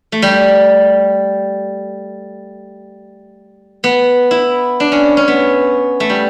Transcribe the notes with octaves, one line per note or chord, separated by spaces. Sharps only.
A3
G3
B3
E4
D4
C#4
C#4
B3
A3
G3